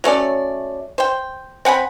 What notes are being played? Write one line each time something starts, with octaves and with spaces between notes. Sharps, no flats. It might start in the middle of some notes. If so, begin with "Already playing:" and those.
F#3 A3 C#4 D5
C5 G5
C4 F#5 G#5 B5